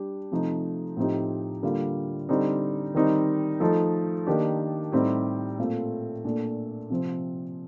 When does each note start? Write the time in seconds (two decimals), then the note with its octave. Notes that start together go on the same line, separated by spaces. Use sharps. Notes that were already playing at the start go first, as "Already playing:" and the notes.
Already playing: G3 D4 G4
0.31 C3 F3 A3 D#4
0.97 A2 F3 C4 D#4 G4
1.63 D3 G3 A#3 F4
2.29 D3 G3 C4 D#4
2.95 D#3 G3 C4 D#4
3.60 F3 A3 D#4 A4
4.27 D#3 A#3 D4 G4
4.92 A2 G3 C4 D#4 G4
5.59 A#2 A3 C4 F4 A4
6.24 A#2 A3 D4 A4
6.90 C3 F3 C4